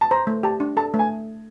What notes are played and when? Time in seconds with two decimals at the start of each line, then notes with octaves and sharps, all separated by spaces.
0.01 A5
0.11 C5 A#5
0.27 A3
0.43 G4 A5
0.60 D4
0.77 A4 A5
0.94 A3
0.99 G#5